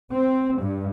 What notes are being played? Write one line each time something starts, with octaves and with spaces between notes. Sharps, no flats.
C4
G2